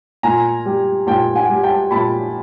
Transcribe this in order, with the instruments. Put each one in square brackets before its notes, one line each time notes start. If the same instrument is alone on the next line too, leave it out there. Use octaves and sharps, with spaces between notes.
[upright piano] A#2 G#5 A#5
G3
A#2 G5 A5
F#5 G#5
G3
G5 A5
A#2 A5 B5